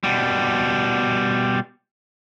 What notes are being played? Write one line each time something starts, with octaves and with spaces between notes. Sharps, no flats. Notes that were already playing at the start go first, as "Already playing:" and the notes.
B2 G3